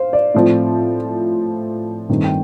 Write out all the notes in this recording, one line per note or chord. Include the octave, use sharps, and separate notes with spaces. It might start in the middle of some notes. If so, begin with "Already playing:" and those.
Already playing: C5 F5
D5
A2 F3 C4
G2 D#3 A3 C4
G5